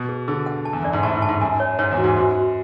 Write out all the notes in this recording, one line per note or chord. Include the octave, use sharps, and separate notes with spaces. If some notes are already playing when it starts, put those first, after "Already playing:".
Already playing: B2
G#4
D3 G#4
F#5
A5
E2
F#2 D5
G#2
A2 A5
G#2
A5
G#2
F#2 G#5
C#5
G#2 C#5
E2
F#4
G#2
F#2 F#4
F#4